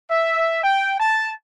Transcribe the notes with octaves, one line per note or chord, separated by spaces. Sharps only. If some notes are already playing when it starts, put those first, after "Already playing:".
E5
G5
A5